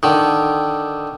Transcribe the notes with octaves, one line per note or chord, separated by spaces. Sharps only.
D3 D#3